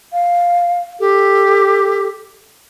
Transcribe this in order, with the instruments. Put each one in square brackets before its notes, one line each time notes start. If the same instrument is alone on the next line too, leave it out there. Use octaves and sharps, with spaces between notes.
[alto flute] F5
[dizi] G4 [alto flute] A4